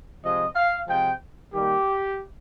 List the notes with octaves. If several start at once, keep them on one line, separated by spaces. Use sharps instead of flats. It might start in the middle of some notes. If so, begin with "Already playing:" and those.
C3 F3 G#3 D#5
F5
C3 F3 G#3 G5
D#3 G3 A#3 G4